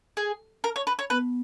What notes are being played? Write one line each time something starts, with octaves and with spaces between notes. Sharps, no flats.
G#4
A#4
C#5
B4
C#5
B3 B4